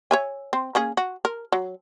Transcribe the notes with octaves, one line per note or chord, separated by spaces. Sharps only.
C#5 E5 G#5
C4
A#3 C#4 G#4
F#4
A#4
F#3